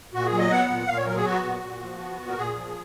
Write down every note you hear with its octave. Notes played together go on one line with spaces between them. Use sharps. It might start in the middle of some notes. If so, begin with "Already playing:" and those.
A#2 F#4
G#4
F#3
D#5
B3 F#5
A#2
A#2 F5
C#5
F#3 A#4
G#4
B3 F#4
A#2
A#2
F3
B3
A#2
A#4
A#2 G#4
F3